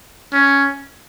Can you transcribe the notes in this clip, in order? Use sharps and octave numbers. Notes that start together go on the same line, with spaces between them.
C#4